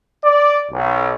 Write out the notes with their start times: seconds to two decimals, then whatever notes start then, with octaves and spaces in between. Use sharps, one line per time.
0.24 D5
0.71 B1